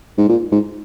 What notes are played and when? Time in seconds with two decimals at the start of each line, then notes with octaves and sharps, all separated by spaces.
0.18 G#2
0.29 A#2
0.52 G#2